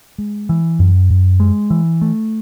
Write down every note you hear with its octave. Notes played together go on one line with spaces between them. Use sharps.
G#3
E3
F#2
F#2
G#3
E3
A3